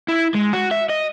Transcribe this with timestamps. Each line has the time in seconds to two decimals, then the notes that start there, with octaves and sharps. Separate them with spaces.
0.08 E4
0.34 G#3
0.53 F#4
0.71 E5
0.89 D#5